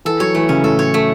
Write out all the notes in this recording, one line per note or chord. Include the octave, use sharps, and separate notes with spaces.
E3 A4
F#3 C#5
E3 A3
C#3 C#4
A2 A4
C#5
A3